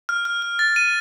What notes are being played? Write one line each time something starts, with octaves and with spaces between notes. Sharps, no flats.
F6
F6
F6
A6
D#7